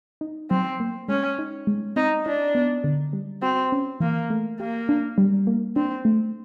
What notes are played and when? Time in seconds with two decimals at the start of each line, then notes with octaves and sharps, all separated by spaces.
0.21 D#4
0.50 F#3 C4
0.80 A#3
1.08 G#3 C#4
1.39 D#4
1.67 G#3
1.96 C4 D#4
2.26 D4 E4
2.55 B3
2.84 D3
3.13 G3
3.42 C4 F#4
3.72 C#4
4.00 E3 A#3
4.30 A3
4.60 A#3 G4
4.89 D4
5.18 G3
5.47 A#3
5.76 C4 D4
6.05 A3